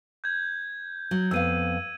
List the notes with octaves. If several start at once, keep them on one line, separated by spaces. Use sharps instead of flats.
G6 G#6
F#3
F2 B3 F5 E6 G6 D#7